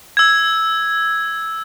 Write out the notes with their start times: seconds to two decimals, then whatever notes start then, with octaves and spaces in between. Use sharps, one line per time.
0.17 E6 G#6